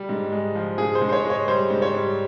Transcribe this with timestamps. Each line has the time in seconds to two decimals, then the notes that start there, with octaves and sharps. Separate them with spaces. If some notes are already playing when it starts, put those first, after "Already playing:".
Already playing: G3
0.09 G#2
0.32 G#3
0.55 F3
0.78 G#2 G#4
0.95 C5
1.01 G#2
1.09 C5
1.13 C#5
1.24 G#3
1.30 C#5
1.47 G3 C5
1.70 G#2
1.82 C#5
1.94 G3